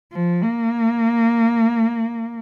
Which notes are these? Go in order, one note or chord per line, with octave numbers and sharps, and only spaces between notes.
F3
A#3